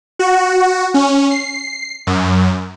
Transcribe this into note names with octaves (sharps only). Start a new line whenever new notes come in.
F#4
C#4
C7
F#2